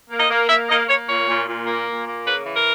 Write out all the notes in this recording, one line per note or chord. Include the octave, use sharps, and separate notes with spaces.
A#3
D#5
A#3
A#3 E5
A#3 D#5
A#3 C#5
A#2 C#5
A#2
A#2
A#3
A#2
A#3
C#3 B4
E3
A#4